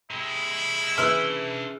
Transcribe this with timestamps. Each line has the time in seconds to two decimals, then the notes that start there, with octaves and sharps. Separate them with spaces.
0.11 C3 G#3 E4
0.98 C#3 E3 D4 C6 E6 F6